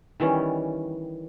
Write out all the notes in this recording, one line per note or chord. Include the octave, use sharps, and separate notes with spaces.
D#3 E3 G3 C#4